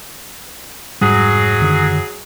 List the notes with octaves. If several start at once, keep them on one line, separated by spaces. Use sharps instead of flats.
F1 G#2 F#3 G3 G#4
F#2 D3 D#3